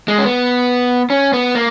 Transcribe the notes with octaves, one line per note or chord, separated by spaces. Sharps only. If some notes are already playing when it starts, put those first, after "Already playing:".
G#3
C#4
B3
C#4
B3
A#3